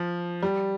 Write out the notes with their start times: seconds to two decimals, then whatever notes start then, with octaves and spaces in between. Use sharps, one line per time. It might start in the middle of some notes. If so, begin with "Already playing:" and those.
Already playing: F3
0.43 G3